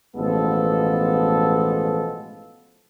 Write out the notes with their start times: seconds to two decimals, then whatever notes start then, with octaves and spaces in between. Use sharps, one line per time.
0.15 A1 B2 F3 G#3 B3 A4